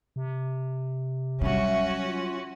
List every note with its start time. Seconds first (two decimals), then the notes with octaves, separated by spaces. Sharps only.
0.16 C3
1.41 F#3 G3 C#4 F#4 E5
2.05 F4